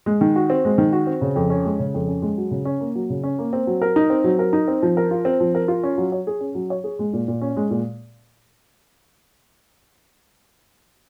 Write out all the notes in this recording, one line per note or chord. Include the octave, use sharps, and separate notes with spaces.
G#3
D#3
F#4
C4
G#3
D#3
F#4
C4
C#3
F2
C#4
G#3
C#3
F2
C#4
G#3
F#3
C#3
C#4
A#3
F#3
C#3
C#4
A#3
C4
F#3
A#4
D#4
C4
F#3
A#4
D#4
C4
F3
A#4
F4
C4
F3
A#4
F4
C#4
F#3
C#5
G#4
C#4
F#3
C#5
G#4
G#3
A#2
A#2
C#4
G#3
A#2